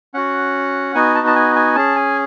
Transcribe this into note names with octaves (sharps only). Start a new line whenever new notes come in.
C#4 F#4 F#5
B3 D#4 F#4 G#5
A5
A5
G#5
G#5
C#4 G#4 A5
G#5